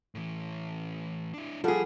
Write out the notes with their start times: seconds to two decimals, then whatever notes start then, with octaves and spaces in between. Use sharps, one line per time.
0.15 A2 E3
1.34 D4 E4
1.64 F3 G3 F4 G#4 A4 F#5